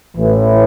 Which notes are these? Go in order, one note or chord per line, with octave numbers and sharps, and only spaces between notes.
A1 A2 E3